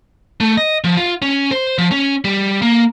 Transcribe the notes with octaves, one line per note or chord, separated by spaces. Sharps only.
A3
D#5
F3
F4
C#4
C5
F3
C#4
G3
A#3